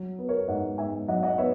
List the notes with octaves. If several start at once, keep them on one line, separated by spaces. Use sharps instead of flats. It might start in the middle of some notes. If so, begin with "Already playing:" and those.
Already playing: F#3
B3
A#4 C#5
G#2 D#5 F#5
G#2 E5 G#5
F#3 D#5 F#5
D#5 F#5
B3 C#5 E5